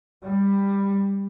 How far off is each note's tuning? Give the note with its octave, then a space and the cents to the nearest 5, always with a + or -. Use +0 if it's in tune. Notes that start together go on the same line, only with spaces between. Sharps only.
G3 +15